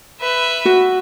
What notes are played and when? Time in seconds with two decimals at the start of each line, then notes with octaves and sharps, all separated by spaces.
0.21 B4 E5
0.65 F#4